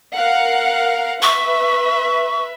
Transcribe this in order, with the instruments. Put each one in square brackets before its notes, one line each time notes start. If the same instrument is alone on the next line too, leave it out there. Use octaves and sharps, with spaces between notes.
[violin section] A#4 F5 F#5
[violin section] B4 E5 [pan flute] C#6